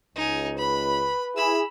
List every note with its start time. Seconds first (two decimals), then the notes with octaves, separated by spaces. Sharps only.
0.16 C#2 D#4 G#5
0.57 B4 B5
1.36 E4 G#4 B5 E6